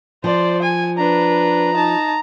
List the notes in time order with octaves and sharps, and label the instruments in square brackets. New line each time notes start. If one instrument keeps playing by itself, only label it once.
[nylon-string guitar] F3 [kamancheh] C5 D5
[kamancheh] G#5
[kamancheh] D4 B4 [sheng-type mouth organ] A#5
[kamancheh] D#4 A5